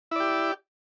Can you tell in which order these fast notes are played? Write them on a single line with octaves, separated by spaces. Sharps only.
E4 D5 G4